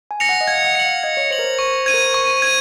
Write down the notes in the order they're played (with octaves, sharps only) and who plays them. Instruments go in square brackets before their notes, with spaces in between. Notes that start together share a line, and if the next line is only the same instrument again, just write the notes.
[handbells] G#5
[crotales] A#6 C#7 F7
[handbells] F#5
D#5
[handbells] F5 [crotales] G#6
[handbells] F#5
[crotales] C#7 F#7
[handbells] F5
[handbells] D#5 [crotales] G#6
[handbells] C#5
[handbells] C5 [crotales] C#7 F#7
[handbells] A#4
C5
[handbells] C5 [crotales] C#6
[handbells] C5 [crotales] G#6 D#7
[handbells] A#4
C5
[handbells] C5 [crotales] C#6
[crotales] G#6 D#7